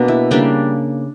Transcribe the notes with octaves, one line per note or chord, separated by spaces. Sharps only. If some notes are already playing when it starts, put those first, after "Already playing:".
Already playing: B2 A#3 D4
E4
C#3 G3 A#3 D4